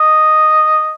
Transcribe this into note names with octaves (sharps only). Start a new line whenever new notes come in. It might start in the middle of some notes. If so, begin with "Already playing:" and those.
Already playing: D#5